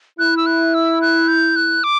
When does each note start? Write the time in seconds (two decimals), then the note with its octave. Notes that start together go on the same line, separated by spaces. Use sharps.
0.19 E4 F#6
0.37 E6
0.46 F#6
0.74 E6
1.01 F#6
1.28 G6
1.56 F#6
1.84 D6